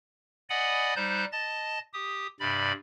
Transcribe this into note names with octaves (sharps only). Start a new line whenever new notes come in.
D5 D#5 F#5 G#5 B5 D#6
G3 D#4 C5 F#6 G6
D#5 A5 A6
G4 D#6
G2 C3 D5 B5